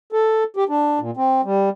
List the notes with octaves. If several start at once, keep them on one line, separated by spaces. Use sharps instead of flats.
A4
G4
D4
A#2
C4
G3